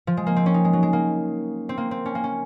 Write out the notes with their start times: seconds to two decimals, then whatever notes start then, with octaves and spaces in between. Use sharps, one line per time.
0.07 F3
0.17 G#3
0.27 A#3
0.36 C4
0.46 C#4
0.54 D#4
0.65 G#3
0.73 F#3
0.83 G#3
0.93 A#3
1.69 C4
1.78 A#3
1.91 C4
2.06 C#4
2.15 A#3
2.24 C#4